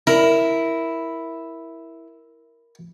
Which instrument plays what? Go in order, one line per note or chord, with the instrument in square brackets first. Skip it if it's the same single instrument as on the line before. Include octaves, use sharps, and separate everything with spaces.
[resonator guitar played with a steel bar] E4 [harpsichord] A#4